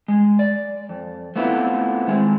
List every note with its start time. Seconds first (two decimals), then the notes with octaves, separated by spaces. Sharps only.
0.08 G#3
0.39 D5
0.89 F2
1.36 A3 B3 C4 E4 F4
2.07 D#3 G#3 C4